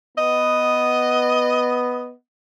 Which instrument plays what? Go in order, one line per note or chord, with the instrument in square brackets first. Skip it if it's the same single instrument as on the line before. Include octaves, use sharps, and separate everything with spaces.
[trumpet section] B3 [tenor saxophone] D#5